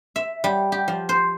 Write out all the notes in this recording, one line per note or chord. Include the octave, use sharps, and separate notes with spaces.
E5
G3
G4
F3
C5